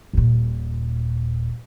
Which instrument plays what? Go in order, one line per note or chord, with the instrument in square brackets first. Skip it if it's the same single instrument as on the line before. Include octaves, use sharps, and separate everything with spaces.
[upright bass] D#1 A#2